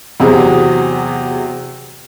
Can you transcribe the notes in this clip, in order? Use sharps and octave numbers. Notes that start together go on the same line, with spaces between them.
E2 C3 F#3 F#4 G#4